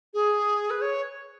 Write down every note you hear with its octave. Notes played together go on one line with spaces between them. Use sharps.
G#4
B4
C#5